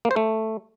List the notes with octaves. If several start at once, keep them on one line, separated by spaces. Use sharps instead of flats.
A#3
C5
A3